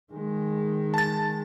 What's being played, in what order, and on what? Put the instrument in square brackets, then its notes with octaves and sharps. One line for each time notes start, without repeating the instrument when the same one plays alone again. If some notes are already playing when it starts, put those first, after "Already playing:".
[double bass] D#3 G#3
[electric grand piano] A5 A6